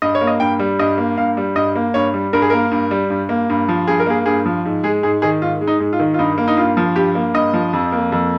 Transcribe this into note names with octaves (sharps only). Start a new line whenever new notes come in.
G2 D#5
C#5
A#3
D#5
G2 G5
G3
G2 D#5
A#3
G2 F5
G3
G2 D#5
A#3
G2 C#5
G3
G2 A#4
G#4
A#3 A#4
G2
G3
G2
A#3
G2
F3
G2 G#4
A#4
A#3 G#4
G2 G#4
F3
G#2
G#3 G#4
G#2 G#4
D#3 G#4
G#2 F4
G#3
D#4
G#2
F4
D#3
F4
G2 D#4
A#3
D#4
G2 F4
F3
G2 G4
A#3
G2 D#5
F3
F2
A#3
F2